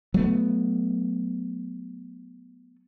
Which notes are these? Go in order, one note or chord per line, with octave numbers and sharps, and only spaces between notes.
F#3 A3 B3